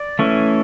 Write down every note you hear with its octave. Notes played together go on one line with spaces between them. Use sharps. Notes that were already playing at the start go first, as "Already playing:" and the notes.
Already playing: D5
E3 A3 C#4